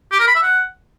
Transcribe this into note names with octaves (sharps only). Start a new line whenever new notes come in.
G4
A#4
B5
E5
F#5